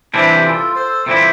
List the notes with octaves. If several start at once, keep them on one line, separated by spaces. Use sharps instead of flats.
C3 E3 G3 C4 D4 E4
G4
F4 A4
A4 C5
C3 E3 G3 C4 E4 F4 A4